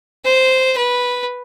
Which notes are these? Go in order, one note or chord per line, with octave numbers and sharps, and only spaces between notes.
C5
B4